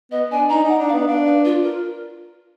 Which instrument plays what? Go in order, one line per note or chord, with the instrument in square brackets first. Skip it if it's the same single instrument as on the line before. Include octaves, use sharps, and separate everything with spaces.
[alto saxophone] B3 [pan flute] D#5
[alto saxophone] D4 [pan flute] G#5
[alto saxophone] D#4 [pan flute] A#5
[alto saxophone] D#4 [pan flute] F#5
[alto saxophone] D4
[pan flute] F5
[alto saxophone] B3
[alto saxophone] D4 [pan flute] F5
[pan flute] B4
F4
[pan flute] F4 [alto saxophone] A#4